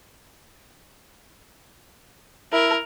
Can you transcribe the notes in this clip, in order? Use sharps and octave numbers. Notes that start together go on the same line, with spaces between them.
E4 A#4